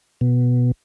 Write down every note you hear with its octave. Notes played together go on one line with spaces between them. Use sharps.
B2